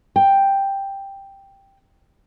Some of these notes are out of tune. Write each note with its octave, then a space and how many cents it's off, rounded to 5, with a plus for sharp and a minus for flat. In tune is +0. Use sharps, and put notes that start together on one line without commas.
G5 +5